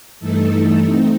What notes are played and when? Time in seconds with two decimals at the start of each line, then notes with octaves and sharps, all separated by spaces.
0.20 G2 E3 A3 D#4 A4
0.83 A3 C4 D#4